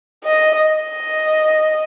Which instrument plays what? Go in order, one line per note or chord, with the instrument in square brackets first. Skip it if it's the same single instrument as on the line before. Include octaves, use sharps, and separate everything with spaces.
[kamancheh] D#5
D#5